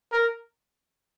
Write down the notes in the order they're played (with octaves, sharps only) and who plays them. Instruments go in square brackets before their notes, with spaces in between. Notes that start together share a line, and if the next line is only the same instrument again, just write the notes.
[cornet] A#4